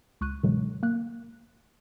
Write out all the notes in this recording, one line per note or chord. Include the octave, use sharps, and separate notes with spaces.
C#2 C#6 F#6 D#7
G2 B2 D3 E3 F#3 G#3
A#3 F#6